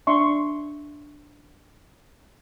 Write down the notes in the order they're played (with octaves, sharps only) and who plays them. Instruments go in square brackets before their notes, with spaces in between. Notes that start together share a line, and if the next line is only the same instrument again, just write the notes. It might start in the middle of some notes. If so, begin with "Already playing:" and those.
[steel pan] D4 E5 C6 C#6